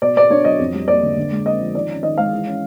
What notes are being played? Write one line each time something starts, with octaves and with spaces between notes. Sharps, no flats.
B2 D5
B3 D5
D4 C#5
F#3 D#5
F2
G3
A#3 D5
D3
D3
G#3
C4 D#5
F3
D#3 D5
C#4
D#3 D#5
G#3 F5
E3
C#4